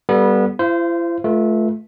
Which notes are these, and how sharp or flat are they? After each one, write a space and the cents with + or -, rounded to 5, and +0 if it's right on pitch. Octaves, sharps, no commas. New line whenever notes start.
G3 +0 B3 -25 A4 +0
E4 +45 C5 -20 F5 -30
A3 -20 F4 +0 B4 -40